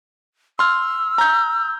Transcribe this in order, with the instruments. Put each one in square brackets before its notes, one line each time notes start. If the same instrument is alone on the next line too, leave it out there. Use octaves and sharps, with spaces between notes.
[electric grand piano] C6 F6 [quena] E6
[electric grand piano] A#5 G6